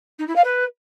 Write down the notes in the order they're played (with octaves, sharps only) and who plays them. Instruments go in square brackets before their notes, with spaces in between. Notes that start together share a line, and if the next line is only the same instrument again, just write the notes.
[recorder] D#4
E4
F5
B4